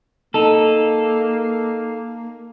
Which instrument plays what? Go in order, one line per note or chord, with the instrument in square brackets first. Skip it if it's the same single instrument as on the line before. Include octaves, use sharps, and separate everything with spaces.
[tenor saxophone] A#3 [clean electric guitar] D#4 A4